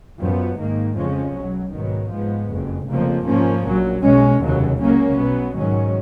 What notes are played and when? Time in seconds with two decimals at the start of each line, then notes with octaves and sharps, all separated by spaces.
0.21 F#2 F3 B3
0.59 G#2 D#3 A#3
0.97 F2 C#3 F3 G#3 C#4
1.36 B1 B2 F#3
1.73 G#2 D#3 F#3 B3
2.12 G#2 F3 G#3 B3
2.50 F#1 F2 C#3
2.88 F1 F2 C#3 F3 A#3
3.26 G#2 F3 A#3 C#4
3.64 A#1 A#2 F#3
4.02 B1 B2 G#3 C#4
4.41 F1 D#2 C#3 F#3
4.79 C#2 C#3 F#3 A#3 C#4
5.17 B1 B2 F#3 B3
5.55 G#2 D#3 F#3 C#4